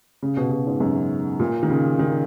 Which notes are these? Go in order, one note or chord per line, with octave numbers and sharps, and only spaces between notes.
C#3
B2
B2
G#2
F#2
A#2
D#3
C#3
D#3